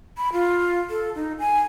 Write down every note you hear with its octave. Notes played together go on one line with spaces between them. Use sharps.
B5
F4
A4
D#4
G#5